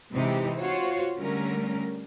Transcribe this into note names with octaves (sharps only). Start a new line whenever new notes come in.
C3 E3 G#3 C4 D#4 G4
F4 F#4 C5 C#5
D3 G3 A3 C#4 A#4